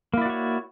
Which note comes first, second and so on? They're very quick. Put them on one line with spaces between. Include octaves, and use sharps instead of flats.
A#3 E4 D5 F#4 C#5